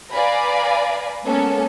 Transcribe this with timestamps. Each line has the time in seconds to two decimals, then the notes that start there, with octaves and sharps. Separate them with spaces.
0.11 B4 D5 F5 G#5 A#5 B5
1.25 G#3 A#3 B3 C#4 A4